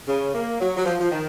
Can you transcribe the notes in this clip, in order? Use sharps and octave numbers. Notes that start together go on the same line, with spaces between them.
C#3
A#3
F#3
F#3
F3
F3
D#3